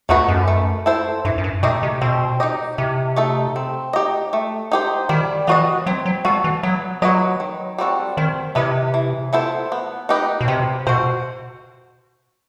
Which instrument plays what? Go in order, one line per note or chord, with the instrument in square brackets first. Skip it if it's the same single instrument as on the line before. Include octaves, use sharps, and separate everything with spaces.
[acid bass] E2 [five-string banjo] A3 D#4 F#4 B4
[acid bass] F#2
[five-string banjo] A3
E4 A4 C5
[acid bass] G2 [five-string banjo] E3
[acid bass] F#2
G2
[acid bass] B2 [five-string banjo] A3 D#4 G4 D#5
[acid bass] C3
[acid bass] B2 [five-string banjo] C4
[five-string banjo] D#4 G4 D#5
[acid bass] C3 [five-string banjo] E3
[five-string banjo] A3 D#4 A4
C4
D#4 G4 D#5
A3
D#4 G4 C5
[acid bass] D#3 [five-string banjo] G3
[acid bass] E3 [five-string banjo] B3 F#4 C5 D#5
[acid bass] F#3 [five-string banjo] C4
[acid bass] F#3
[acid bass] G3 [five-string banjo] F#4 A4
[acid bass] E3
[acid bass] F#3 [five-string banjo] B3
[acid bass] F#3 [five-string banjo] F#4 B4 D#5
[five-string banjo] D#3
G3 C4 F#4 A4
[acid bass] D#3 [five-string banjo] C4
[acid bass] C3 [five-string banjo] E4 B4 D#5
[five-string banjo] E3
B3 E4 A4 C5
B3
D#4 G4 B4 D#5
[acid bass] B2
[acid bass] C3 [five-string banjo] C4
[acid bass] B2 [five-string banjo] F#4 C5